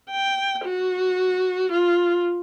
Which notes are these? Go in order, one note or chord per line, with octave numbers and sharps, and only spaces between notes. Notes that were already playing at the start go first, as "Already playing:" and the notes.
G5
F#4
F4